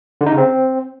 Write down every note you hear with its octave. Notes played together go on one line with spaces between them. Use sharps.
D3
D#4
C#3
C4